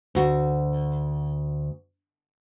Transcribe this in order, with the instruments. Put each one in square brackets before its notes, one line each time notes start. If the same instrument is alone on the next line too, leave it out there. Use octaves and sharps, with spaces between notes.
[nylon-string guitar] D2 F#4